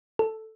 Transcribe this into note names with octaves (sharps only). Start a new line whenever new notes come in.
A4